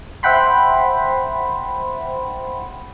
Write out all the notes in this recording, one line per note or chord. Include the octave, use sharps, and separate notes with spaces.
C5 E5 F#5 G5 B5 C6